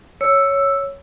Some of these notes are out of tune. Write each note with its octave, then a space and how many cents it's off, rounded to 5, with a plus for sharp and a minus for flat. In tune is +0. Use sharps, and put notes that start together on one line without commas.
C#5 +0 E6 +5